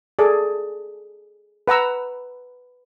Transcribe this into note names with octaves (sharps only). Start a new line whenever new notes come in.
G#4 A4 D5
B4 F#5 A#5 E6